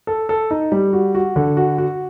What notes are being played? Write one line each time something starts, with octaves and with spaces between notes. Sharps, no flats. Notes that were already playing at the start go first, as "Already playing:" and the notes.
A4
A4
D#4
G3
F#4
F#4
D3
F#4
F#4